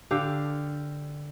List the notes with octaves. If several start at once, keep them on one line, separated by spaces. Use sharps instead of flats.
D3 G4 F5